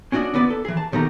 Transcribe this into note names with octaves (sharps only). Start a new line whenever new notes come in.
C#4 D4 F#4 D5 D#5
D3 B3 E4 B4 D5
A4
E3 G#4
A5
B2 D#3 A3 G4 A#5